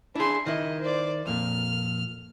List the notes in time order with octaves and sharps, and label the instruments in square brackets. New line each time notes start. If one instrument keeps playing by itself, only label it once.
[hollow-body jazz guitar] D4 G#4 [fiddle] E4 C6
[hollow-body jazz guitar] D#3 E4 [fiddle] D#5
[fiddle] C5 D5
[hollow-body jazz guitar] F2 A#2 [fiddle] F6